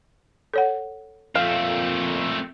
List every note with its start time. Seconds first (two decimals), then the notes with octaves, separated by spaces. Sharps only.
0.54 A4 C#5 F#5
1.35 F2 A#2 A3 C4 F5